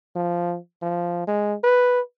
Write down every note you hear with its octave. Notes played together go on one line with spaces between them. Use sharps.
F3
F3
G#3
B4